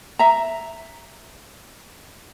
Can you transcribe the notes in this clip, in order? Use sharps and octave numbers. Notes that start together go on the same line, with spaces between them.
E5 A#5